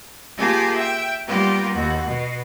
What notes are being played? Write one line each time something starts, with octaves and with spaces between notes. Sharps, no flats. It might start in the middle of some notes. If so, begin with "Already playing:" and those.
A#3 F4 G4 G#4 G#5 A5
E5 G5
G3 A#3 B3 F4 G4
D#2 F#4
B2